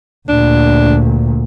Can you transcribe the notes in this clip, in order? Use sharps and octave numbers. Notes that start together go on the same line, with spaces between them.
D2 A#2 D4